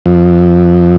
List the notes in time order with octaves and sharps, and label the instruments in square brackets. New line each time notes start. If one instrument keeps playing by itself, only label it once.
[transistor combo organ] F2